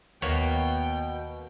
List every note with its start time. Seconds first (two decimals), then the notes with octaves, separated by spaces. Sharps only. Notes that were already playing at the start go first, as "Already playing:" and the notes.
0.22 D#2 B2 A#3 B3 C#5 G5